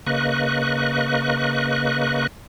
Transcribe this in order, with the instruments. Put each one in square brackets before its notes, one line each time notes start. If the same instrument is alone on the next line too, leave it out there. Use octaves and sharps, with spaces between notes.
[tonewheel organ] C#3 A#3 B4 D#5 C#6 F#6